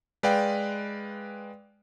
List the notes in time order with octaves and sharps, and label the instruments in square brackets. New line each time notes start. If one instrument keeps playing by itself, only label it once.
[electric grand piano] G#3 B4 D5 F5 G5